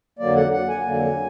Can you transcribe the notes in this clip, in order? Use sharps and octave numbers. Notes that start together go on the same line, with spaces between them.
F2 D3 F#3 A#3 D5
F#5
F#5
G#5
F2 D3 F#3 A#3